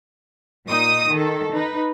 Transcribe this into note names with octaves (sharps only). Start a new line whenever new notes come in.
A#2 D#4 D#6
D#3 A4
D#4 B4